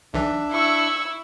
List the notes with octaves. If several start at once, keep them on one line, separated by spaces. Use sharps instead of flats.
B1 E3 D4 E5
E4 C#6 E6